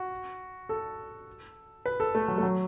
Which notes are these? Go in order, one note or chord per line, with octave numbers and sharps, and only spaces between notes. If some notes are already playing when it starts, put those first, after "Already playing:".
Already playing: F#4
A4
B4
A4
A3
F#3
A3
F#3